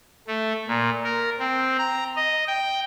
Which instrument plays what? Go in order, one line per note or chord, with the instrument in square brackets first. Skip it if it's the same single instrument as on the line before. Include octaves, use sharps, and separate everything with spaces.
[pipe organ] A3
A#2
A#4
C4
A#5
D#5
G5